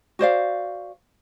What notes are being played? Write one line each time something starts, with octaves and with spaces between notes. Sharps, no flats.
F#4 C5 D5 F5